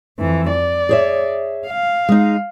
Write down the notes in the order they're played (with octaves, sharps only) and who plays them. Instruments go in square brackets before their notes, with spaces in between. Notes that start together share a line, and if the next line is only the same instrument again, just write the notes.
[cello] F2 E3
D5
[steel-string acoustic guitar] G#4 C#5 E5
[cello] F5
[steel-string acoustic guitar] G#3 D#4